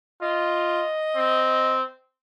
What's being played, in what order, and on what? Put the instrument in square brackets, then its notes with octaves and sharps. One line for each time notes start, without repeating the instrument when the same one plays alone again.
[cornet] F4 [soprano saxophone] D#5
[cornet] C4